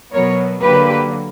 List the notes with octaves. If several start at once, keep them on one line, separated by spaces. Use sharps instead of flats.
B2 F#3 B3 A#4 C#5
D3 F#3 A#3 G4 B4